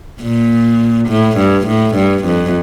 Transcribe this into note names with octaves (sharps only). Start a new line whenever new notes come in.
A#2
A2
G2
A2
G2
F2